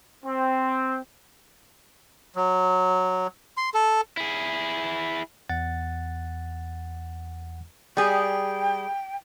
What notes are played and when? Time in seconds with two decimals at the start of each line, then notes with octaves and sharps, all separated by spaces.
0.25 C4
2.36 F#3
3.57 C6
3.74 A4
4.17 E4 G#4
5.49 E2 F#5 A6
7.97 G3 G#4 G5